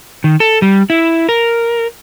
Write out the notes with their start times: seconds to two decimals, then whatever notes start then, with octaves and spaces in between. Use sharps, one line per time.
0.24 D#3
0.40 A4
0.62 G3
0.90 E4
1.29 A#4